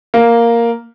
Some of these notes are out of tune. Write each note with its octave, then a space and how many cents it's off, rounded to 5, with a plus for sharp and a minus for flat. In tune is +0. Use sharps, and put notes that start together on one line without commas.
A#3 +0 A#4 +0